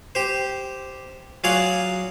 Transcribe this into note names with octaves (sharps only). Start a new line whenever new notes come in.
G4 C5
F#3 F4 G#4 D5 F5 F#5